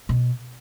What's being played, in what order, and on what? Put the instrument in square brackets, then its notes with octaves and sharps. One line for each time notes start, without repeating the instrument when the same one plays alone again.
[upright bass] B2